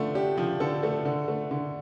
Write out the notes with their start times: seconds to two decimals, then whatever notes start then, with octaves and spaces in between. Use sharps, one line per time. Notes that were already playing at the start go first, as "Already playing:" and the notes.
Already playing: D3 F3 A3
0.15 D4 G4
0.37 F3
0.60 D3 A4
0.83 A3
1.05 D3
1.28 A3
1.51 D3